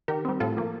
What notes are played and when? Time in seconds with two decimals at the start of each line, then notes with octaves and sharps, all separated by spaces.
0.08 D#3 G4 A#4
0.25 G3 C4
0.40 A2 F4 A4
0.57 F3 A#3